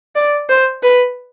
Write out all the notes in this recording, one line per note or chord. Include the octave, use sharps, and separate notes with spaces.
D5
C5
B4